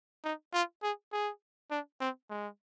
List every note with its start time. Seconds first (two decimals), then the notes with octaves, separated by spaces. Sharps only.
0.24 D#4
0.53 F4
0.83 G#4
1.12 G#4
1.71 D4
2.00 C4
2.30 G#3